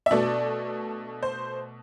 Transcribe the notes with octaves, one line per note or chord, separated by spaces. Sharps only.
E5
B2 A3 D4 D5
C5